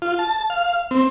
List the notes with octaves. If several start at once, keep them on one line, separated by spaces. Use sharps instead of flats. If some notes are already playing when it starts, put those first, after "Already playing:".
F4
A5
F5
C4